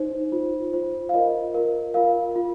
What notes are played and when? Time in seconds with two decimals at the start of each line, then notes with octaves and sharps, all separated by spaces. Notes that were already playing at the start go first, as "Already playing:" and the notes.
Already playing: D#4 C5
0.32 F4 C5
0.73 F4 C5
1.09 F5
1.14 F4 A#4 D#5
1.54 F4 A#4
1.94 F4 A#4 F5
2.36 F4